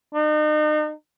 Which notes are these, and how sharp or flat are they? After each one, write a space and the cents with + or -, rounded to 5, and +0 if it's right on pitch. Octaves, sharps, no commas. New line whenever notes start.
D#4 -40